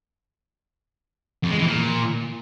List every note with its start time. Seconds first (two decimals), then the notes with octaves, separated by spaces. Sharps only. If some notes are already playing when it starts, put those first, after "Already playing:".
1.43 F2
1.51 G#3
1.58 E3
1.66 A#2